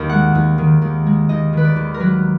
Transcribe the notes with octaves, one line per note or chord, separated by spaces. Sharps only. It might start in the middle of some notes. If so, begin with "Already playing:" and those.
Already playing: D#2 D#3
G#3 F#5
D#2
D#3
D#2
G#3
D#2 D#5
D#3 B4
D5
D#2
A#4
F#3 B4